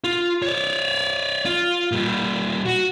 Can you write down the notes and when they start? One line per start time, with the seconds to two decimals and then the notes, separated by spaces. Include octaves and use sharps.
0.04 F4
0.42 C#5 D5
1.45 F4
1.92 A#2 G3
2.66 F#4